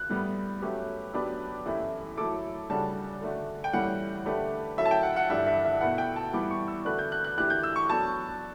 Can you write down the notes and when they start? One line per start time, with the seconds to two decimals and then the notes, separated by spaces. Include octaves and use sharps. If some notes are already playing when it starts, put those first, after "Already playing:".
Already playing: F#6
0.09 A2 G3 B3
0.62 F#3 A3 C#4 G4 B4
1.14 F#3 B3 D4 G4 B4
1.66 F#2 E3 A3 E4 G4
2.17 F#3 A3 E4 A4 D6
2.69 C#3 G3 D4 F#4 A4 A5
3.21 D3 A3 D4 F#4
3.64 G5
3.73 A2 E3 G3 C#4 F#5
4.25 D3 A3 D4 G4 B4
4.78 F#3 C#4 E4 A4 E5
4.85 A5
4.91 G5
5.03 F#5
5.16 F#5
5.30 G2 E3 A3 D4 G4 E5
5.46 E5
5.65 E5
5.81 B2 A3 E4 B4 F#5
5.98 G5
6.16 A5
6.33 E3 G3 B3 D6
6.51 C#6
6.68 E6
6.85 D3 A3 D4 F#4 B4 F#6
6.99 G6
7.12 F#6
7.24 F#6
7.37 E3 A3 D4 G4 F#6
7.50 G6
7.63 E6
7.76 C#6
7.89 F#3 B3 D4 A4 A5